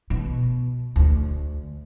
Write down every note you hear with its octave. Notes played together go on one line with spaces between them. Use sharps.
B2
D2